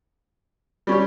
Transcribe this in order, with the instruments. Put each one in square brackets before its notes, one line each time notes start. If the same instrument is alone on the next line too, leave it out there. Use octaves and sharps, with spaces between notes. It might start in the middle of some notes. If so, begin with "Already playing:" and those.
[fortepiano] G3 C#4 G4